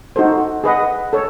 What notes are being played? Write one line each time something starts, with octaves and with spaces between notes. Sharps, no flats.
D#4 F#4 A4 C5
G#4 B4 D#5 F#5
A4 C#5